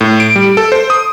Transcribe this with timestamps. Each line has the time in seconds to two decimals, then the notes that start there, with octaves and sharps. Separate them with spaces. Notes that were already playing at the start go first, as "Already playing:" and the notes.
0.01 A2
0.20 D7
0.36 G3
0.57 A4
0.72 C5
0.90 D#6